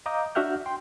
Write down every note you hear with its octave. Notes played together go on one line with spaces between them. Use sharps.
D#5 F5 A#5 D6 D#6 G6
D4 F#4 E5 F#5 F6 G6
G5 C6